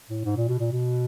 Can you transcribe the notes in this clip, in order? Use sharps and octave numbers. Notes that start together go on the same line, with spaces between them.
A2
G#2
A#2
B2
A#2
B2